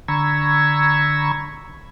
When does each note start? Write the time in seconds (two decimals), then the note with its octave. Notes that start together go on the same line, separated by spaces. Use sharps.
0.08 D3 A#5 B5 C#6 E6 G#6